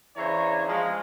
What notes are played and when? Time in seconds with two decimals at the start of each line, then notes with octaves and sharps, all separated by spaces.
0.17 C#3 E3 D4 C5 C#5 A#5
0.67 F3 G#3